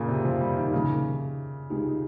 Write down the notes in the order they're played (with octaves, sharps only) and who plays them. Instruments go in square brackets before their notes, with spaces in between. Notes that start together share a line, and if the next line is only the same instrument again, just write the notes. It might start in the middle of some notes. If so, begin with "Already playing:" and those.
Already playing: [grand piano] A#2 C#3
C3
F3
G3
D#3
[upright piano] C2 A#2 F3 A#3 D#4 [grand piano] C#3
[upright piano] C#2 C3 D#3 G#3 D#4